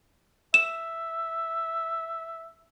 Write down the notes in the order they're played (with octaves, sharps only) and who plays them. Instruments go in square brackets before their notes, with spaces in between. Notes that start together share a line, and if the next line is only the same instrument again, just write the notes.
[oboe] E5 [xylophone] E7